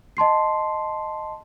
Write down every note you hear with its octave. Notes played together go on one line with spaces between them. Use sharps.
D#5 A5 C6 C7